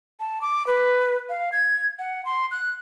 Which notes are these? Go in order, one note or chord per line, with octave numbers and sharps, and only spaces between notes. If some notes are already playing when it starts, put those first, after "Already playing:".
A5
D6
B4
F5
G#6
F#5
C6
F#6